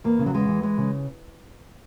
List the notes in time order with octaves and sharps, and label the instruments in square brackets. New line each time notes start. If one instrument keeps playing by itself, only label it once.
[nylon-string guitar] E2 A#3
C#3
F#3
E2 G#3
E3
E3 G#3
C#3